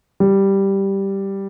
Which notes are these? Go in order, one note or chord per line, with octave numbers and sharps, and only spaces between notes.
G3